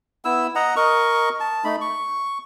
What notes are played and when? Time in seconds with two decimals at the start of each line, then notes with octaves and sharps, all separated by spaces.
0.25 B3 E4 E6
0.55 D#5 F#5 A#5
0.76 A#4 D#5 C#6
1.40 A5
1.64 A3 D#4 B5
1.81 C#6